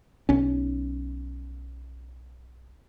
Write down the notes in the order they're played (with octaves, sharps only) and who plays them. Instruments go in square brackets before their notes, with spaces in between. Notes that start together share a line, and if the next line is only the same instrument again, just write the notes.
[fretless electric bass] B1 C#4